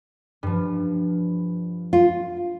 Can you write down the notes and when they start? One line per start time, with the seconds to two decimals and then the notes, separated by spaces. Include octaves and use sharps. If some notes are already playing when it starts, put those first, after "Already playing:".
0.43 G2 F3
1.93 F4